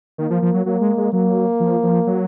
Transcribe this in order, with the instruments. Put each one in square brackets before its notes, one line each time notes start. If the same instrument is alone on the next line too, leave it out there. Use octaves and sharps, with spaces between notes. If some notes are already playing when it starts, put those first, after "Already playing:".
[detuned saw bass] D#3 [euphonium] A#3
[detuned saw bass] F3
F3
F#3
[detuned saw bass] F#3 [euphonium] A#3
[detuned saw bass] G#3
G#3
[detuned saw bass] F#3 [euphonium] A#3
[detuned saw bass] F3
F3
F#3